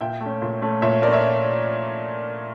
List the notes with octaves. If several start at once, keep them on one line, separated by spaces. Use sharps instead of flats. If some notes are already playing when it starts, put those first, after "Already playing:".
A#2 E5 G5
A3
C#4
A#2
A3 C#4
A#2 C#5 E5
A3 C#4 A#4 D5
C#5 E5